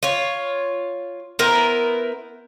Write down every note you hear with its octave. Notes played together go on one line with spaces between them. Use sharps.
F4 C#5
B3 E4 A#4 C5